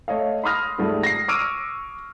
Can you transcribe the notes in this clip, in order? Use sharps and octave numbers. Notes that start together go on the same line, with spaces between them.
A3 C#5 D#5 F5
B5 C6 D#6 F6 A#6
G#2 F3 G3 A3
A#6 C7
C#6 D6 E6 F6 D7 D#7